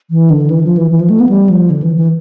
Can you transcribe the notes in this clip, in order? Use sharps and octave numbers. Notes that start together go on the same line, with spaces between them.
E3
D3
E3
F3
E3
E3
F3
A3
B3
G3
F3
D3
E3
E3